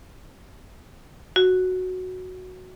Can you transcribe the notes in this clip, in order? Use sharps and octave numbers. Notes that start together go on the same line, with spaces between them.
F#4